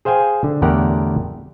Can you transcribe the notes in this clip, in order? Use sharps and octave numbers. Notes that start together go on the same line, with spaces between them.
G#4 C5 F5 G5 G#5
D3
E2 A2 D3 G4 A#4 F#5